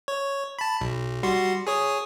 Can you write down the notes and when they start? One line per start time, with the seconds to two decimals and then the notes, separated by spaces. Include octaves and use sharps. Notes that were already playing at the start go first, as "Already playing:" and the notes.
0.08 C#5
0.59 A5 B5
0.81 B1
1.23 G3 F#4 C6
1.67 G#4 C#5 D#6